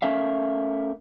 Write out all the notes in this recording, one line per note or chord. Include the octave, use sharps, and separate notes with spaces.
A3 C#4 A#4 E5 F5